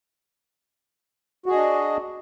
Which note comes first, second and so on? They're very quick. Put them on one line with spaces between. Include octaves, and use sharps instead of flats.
F#4 G#4 D#5 D4